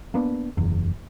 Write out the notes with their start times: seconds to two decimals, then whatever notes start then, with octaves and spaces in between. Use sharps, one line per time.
0.14 A#3 B3 D4
0.57 F#1 E2